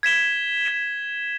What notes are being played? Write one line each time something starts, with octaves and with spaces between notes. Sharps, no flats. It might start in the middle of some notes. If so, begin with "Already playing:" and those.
G#6 B6 E7 G7
G#6 B6 E7 G7